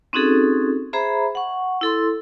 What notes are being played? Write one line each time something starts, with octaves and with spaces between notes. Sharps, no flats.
C4 C#4 D#4 F#4 G#4 A4
G#4 C5 E5 A#5 B5
F#5 C#6
E4 A4 C6